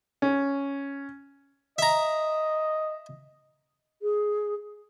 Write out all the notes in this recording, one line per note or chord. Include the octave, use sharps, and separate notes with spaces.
C#4
D#5 E5 A#5
G#4